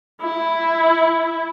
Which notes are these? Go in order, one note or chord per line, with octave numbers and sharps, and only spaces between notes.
E4